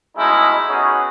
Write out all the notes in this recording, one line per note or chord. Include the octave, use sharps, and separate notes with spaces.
B2 G#3 A3 C#4 D#4 E4
B3 C#4 D#4 F#4 G#4